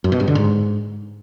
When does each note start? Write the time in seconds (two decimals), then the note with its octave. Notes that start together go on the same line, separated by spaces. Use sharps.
0.04 F#2
0.12 B2
0.20 G2
0.28 D3
0.35 G#2